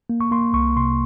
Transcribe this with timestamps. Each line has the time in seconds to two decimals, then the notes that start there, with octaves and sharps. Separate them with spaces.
0.10 A#3
0.21 C#6
0.31 A#3 C6
0.54 C2 C#6
0.76 C3 C6